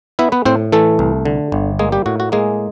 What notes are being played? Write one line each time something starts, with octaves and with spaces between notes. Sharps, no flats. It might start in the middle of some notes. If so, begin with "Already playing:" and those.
B3 E4 E5
B3 B4
A2 C4 C5
E3 A3 A4
C2
D3
G1
G#3 A#3 G#4
G3 G4
A2 F#4
F#4
G#3 A#3 G#4